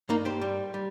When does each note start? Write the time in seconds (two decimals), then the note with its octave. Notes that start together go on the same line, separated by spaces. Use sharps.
0.09 G2 A#3 D#4
0.25 G4 C5
0.41 G3
0.74 G3